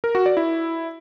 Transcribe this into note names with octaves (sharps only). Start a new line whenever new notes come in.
A#4
F#4
D5
E4